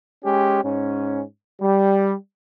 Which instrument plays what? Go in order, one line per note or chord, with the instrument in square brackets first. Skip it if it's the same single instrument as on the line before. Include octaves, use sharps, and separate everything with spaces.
[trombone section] G#3 C#4 G4
G#2 C#4
G3